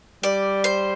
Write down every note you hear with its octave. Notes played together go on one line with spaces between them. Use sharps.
G3 D5
C5